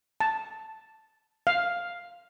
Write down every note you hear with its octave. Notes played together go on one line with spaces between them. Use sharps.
A5
F5